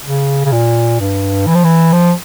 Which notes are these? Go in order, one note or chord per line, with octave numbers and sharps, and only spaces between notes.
C#3
C#3
A#2
G2
E3
F3
E3
F3